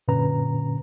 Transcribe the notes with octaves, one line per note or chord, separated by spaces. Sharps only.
F#2 A#2 D3 C#4 B4 A#5